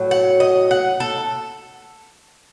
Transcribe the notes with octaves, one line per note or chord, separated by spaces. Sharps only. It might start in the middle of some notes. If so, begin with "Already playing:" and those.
Already playing: A2 F#3
F#5
D#5
F#5
A4